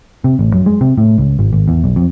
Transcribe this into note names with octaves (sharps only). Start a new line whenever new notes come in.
C3
A1
F#2
G#3
C3
A2
C#2
G#1
G#1
E2
B1
F2